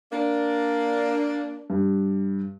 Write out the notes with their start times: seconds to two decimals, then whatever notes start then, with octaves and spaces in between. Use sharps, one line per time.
0.12 A#3 D4
1.70 G2